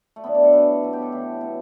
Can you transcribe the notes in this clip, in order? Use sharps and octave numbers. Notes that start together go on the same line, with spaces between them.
A3
G2 D3 F#3 B3
D4
A4
A2 E3 B4
B2 F#3
G4
A4
A2 E3
B2 F#3